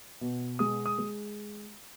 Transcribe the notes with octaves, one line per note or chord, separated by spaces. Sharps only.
B2
G#3 D#6
D#6
G#3